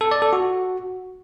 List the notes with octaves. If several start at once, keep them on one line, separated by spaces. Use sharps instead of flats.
A4
D5
A4
F#4